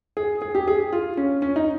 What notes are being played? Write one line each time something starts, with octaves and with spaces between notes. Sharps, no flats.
G#4
G#4
G4
G#4
F4
C#4
C#4
D#4